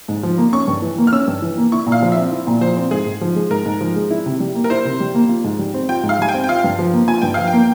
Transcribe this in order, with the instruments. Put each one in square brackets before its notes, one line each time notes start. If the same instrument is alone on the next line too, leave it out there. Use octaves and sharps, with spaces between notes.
[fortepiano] G#2
F3
A#3
[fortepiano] C#4 [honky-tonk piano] C#6
[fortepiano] G2
E3
A#3
[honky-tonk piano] F6
[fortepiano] C#4 [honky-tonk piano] E6
[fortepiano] G2
E3
A#3
[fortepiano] E4 [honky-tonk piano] C#6
[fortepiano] A#2
[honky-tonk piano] F5
[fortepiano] F3
[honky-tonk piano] E5
[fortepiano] C4
E4
A#2
[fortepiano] F3 [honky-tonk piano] C5
[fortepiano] C4
[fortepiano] G#2 [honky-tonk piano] G#4
[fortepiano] G#2
F3
G#3
[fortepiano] G#2 [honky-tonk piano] A#4
[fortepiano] G#2
F3
G#3
E4
C3
G3
A#3
[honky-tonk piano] A#4
[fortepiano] E4 [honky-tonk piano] C5
[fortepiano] C3
G3
A#3
F4
G#2
G3
C4
[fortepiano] F4 [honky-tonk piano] G5
[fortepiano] G#2
[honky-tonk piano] F5
[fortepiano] G3 [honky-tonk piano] G#5
[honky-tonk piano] G5
[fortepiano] C4
[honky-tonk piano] G5
[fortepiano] F4 [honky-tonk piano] F5
[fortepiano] G2
F3
A#3
[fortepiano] F4 [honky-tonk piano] G#5
[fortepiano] G2 [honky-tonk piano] G5
[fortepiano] F3 [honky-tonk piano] F5
[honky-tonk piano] G5
[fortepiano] A#3